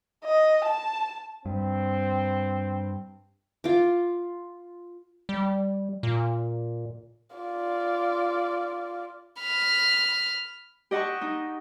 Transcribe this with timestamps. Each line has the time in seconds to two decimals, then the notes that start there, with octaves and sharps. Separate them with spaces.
0.25 D#5
0.65 A5
1.46 G2 C4
3.64 F4 D6
5.29 G3
6.03 A#2
7.36 F4 D5
9.40 B5 F6
10.91 G4 D#5 F#5 A5 C#6
11.21 D#4